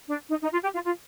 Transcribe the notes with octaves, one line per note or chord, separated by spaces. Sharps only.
D4
D#4
D#4
F4
G4
F4
F4